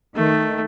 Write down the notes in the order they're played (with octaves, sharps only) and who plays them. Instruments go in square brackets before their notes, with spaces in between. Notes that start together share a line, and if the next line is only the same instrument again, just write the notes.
[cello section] D#3 [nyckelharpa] A3